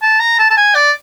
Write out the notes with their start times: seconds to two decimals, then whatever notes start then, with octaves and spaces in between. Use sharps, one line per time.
0.02 A5
0.20 A#5
0.39 A5
0.50 A5
0.57 G#5
0.75 D5